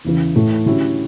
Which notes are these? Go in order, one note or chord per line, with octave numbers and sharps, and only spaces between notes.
E2 C#3 E3
A2 E3 A3 E4
D3 F#3 C#4 E4 G4